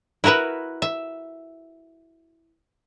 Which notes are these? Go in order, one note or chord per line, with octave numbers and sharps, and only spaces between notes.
E4 F#4 A#4 B4 E5
E5